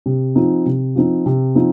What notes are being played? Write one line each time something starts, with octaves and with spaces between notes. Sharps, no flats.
C3
F3 C4 D#4
C3
F3 C4 D#4
C3
F3 C4 D#4